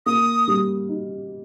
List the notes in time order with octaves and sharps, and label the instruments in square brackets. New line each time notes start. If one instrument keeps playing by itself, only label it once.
[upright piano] A#3 [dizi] D#6
[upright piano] G3
D#4